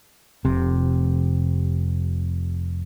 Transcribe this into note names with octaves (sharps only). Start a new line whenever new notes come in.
F1 C3